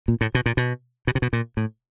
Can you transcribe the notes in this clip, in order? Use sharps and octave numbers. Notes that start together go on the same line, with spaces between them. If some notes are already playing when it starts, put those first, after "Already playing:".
A#2
A2
B2
A#2
B2
B2
C3
B2
A#2
A2